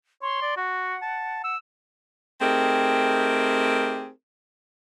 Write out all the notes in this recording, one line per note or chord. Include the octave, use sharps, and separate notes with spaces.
C#5 C6
D5
F#4 F#5
A5
E6
A3 C4 D#4 G4 G#4 A#4